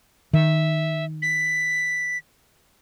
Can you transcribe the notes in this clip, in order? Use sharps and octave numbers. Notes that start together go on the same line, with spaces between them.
D#3 E5
B6